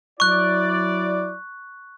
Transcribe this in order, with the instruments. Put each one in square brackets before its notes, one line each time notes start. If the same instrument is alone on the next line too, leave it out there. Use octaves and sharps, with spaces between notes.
[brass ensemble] F#3 E4 D5 [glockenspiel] C#6 F#6